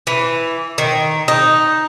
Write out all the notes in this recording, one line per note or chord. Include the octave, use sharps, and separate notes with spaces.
E3
D#3
D#4